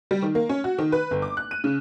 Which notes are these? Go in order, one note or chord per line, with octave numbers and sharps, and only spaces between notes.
G3
D#3
A#3
C#4
F#4
D#3
B4
G1
D6
F#6
D#7
C#3